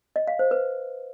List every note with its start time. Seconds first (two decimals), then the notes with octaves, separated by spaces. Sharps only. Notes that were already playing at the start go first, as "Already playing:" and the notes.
0.16 D#5
0.27 F5
0.39 C5
0.51 B4